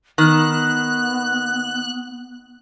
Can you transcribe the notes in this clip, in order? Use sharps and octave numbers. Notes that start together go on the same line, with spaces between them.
D#3 B3 F#6